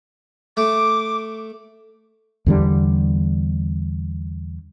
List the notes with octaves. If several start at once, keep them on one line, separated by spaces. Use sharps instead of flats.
A3 D6
E2 D3 G3